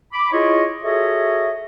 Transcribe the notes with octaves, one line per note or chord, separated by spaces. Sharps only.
B5 D6
E4 F4 G#4 C#5 D#5
F#4 G#4 A4 C#5 D#5 E5